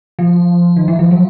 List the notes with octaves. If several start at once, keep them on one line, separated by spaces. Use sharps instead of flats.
F3
D#3
E3
F3
F#3